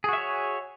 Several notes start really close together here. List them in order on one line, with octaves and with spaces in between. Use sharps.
G#4 F#4 E5 C#5